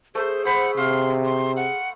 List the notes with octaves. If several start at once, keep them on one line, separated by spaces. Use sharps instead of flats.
A3 G#4 C5
C5 F#5 B5
C3 F5 C6
C6
F#5